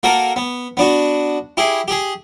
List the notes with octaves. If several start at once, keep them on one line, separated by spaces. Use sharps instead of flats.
A#3 F#4 A4 A#4
B3
B3 D4 F#4
E4 G4 G#4
G4 G#4